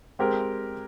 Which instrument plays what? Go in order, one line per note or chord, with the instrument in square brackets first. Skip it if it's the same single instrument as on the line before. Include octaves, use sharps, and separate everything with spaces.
[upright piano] G#3 C4 G4 A#4